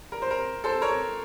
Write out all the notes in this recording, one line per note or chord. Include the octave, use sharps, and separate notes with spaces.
A#4
C5
A#4
A4 C5
A#4 C#5